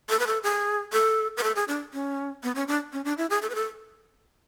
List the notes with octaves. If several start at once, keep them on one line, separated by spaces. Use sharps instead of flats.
A4
B4
A4
G#4
A4
B4
A4
G#4
D4
C#4
B3
C#4
D4
C#4
D4
E4
G#4
A4
B4
A4